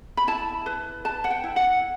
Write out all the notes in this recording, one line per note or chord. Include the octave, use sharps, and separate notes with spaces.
B5
E4 A5
B4
B4 A5
F#5
G5
E4
F#5